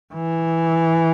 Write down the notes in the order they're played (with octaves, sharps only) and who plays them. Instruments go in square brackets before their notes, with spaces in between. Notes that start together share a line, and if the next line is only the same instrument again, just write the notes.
[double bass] E3